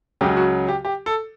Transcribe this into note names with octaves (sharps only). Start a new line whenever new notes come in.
C#2 C#3 F#3 G4
F#4
G4
G4
A4